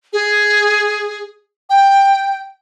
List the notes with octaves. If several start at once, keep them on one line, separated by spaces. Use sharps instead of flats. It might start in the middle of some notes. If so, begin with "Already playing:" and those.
G#4
G5